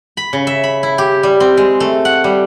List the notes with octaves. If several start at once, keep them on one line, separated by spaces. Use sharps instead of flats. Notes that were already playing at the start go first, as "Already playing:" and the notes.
B5
C#3
E5
B5
E4
G4
G3
C4
G#3
A3
F#5
G3